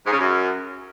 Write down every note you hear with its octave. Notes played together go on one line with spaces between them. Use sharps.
G#2
C#3
F#2